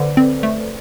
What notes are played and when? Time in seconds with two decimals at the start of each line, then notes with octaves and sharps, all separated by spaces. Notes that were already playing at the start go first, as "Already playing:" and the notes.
Already playing: D3 A4 B4 C5 D5
0.17 C4
0.43 A3